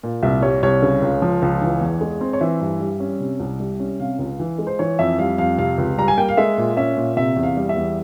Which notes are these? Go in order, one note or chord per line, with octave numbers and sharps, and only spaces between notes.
A#2
C2 E5
G3 C#5
C2 C#5
C#3
C#2
F3
C#2
E3
E2
G#3
C4
C#5
E3 E5
G2
G3
C#4
C3
C2
G3
C#4
C3 F5
C#2
E3
G#3
C5
E3 C#5
F2 E5
G3 F5
F2 F5
C3 F5
C#2
G3 A#5
G#5
A#3 G5
F5
G#3 E5
A#2
C#4 E5
A#2
C3 E5
E2
F5
G3
E5
E2